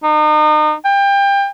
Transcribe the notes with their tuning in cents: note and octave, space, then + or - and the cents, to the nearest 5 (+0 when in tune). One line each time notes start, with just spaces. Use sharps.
D#4 -35
G5 +25